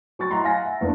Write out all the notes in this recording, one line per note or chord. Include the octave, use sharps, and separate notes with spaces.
F#3 C#6 A6
E4 D#5 F#5 A#5 C6
F5 F#5 G#5 A#6
E5
E2 A#3 D4